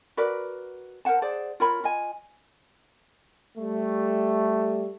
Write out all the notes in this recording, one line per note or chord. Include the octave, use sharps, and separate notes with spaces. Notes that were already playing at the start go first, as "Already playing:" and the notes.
F#4 A#4 B4 D5
A#4 C5 F#5 A5
G#4 C5 D5 F#5
F4 A#4 C#5 B5
F4 D#5 G#5
G3 A3